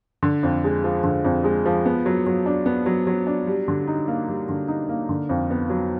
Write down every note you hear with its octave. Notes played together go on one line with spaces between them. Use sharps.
D3
F2
G#3
F3
D3
F2
G#3
F3
B3
F#3
F#3
D4
B3
F#3
F#3
D4
G3
D3
D#4
A#3
G3
D3
D#4
A#3
D3
F2
B3
F#3